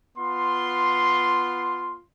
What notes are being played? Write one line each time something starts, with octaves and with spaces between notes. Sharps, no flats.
B3 F4 C6